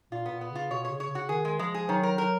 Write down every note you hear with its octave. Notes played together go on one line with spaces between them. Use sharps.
A#2 F4
B3
A#2
B3
C#3 F4
B2 C#5
C#5
C#3
C#5
C#3
F#4
D#3 G#4
G#3
F3 G#3
G#4
D#3 F#3
A#4
F#3 A#4